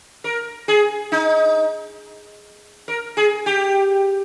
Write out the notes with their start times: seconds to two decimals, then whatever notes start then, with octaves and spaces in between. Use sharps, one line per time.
0.24 A#4
0.68 G#4
1.12 D#4
2.88 A#4
3.17 G#4
3.46 G4